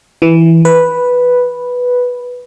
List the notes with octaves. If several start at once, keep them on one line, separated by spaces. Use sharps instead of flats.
E3
B4